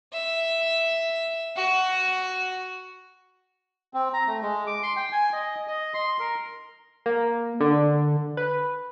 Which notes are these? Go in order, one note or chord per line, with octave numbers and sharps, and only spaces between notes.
E5
F#4
C4
A#5
A3
G#3
D6
C6
G5
G#5
D#5
D#5
C6
A#4
A#3
D3
B4